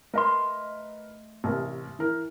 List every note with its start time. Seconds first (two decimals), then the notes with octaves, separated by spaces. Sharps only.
0.14 A3 A#4 B4 D#5 C6
1.44 A1 C3 A#4
1.99 E3 A#4